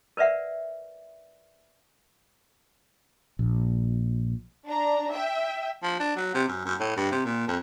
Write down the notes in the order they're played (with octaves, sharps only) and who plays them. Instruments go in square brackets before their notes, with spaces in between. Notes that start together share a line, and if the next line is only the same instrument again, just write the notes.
[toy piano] A#4 B4 D5 E5 F#5
[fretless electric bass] A#1
[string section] D4 A#5
E5 G5
[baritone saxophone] F3
D4
F#3
C3
F#2
F#2
A2
G2
C3
A#2
F2